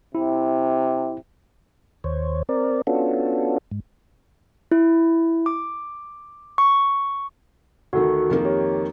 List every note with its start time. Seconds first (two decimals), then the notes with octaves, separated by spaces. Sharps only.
0.15 C3 E4
2.04 D#2 C5 C#5
2.49 C4 A#4 D5
2.87 B3 C#4 D4 F4 F#4 A4
3.71 G#2
4.72 E4
5.46 D6
6.58 C#6
7.93 D2 D#3 F#4 A4
8.30 F2 D#3 A#3
8.45 G4 C#5